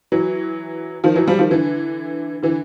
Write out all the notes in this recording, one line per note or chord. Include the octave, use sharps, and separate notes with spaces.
E3 F#3
D#3 F3
E3 F#3
F3 G3
D#3 F3
D3 E3
D3 E3